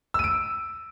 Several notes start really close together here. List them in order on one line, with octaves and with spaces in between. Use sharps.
E6 D#7 D7